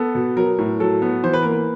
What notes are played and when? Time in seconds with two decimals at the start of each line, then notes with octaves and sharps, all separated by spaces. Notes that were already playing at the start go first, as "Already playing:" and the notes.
Already playing: B3 A4
0.15 B2
0.37 F#3 A#4
0.59 A2
0.80 F#3 A4
1.02 B3
1.23 E3 C5
1.33 B4
1.43 A#3 A#4
1.52 B4